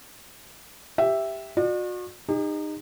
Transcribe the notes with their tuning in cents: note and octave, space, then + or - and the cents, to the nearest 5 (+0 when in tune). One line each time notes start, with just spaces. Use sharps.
G4 +0 E5 +0
F#4 -40 D5 +40
D#4 -20 G4 +45